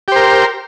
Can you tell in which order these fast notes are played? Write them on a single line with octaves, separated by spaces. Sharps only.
G4 C5 A#4